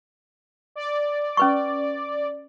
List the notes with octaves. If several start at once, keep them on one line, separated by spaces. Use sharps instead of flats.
D5
C#4 B4 C#6